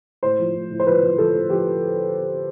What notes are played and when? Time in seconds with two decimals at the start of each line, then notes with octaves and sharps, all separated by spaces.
0.23 A2 C5
0.39 F3
0.54 A2
0.71 A2
0.79 C5
0.86 F3 B4
1.03 F3
1.18 F3 A4
1.34 A2
1.50 F3 G4